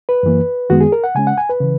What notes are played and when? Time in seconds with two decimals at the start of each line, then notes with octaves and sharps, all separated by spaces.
0.09 B4
0.23 F#2 E3 A#3
0.69 F#2 D#3 G#3 B3 F#4
0.81 G#4
0.92 A#4
1.04 F#5
1.15 C#3 G#3 C#4 G#5
1.27 F#5
1.38 G#5
1.49 B4
1.60 C#3 E3